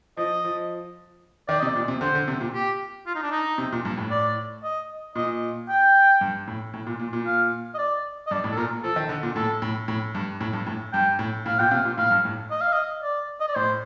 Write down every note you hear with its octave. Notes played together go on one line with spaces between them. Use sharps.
F3 D#5
F3
D#3 D5
C3 D#5
D5
A#2
C3
D3 C5
D3
C3
A#2
G4
F4
D#4
D4
D#4
C3
A#2
G2
A2
D5
D#5
A#2 D#5
G5
G2
A2
A2
A#2
A#2
A#2
F5
D#5
D5
D#5
G2 D5
A2
A4
A#2 A#4
F3 A4
D#3
D3
A#2
A2 A4
A2
A2
G2
A2
G2
A2
G2 G5
A2
A2 F5
A#2 G5
C3 F5
A#2
A2 F5
G2
A2
D#5
F5
D#5
D5
D#5
D5
A2 C5